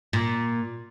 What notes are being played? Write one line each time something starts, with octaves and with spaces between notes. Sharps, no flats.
A#2